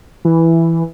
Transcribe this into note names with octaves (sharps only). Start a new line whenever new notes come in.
E3